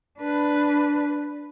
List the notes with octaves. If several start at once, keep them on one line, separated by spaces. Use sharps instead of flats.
D4 B4